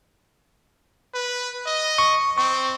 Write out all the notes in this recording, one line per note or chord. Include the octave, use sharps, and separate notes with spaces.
B4
D#5
C#6
C4 C#6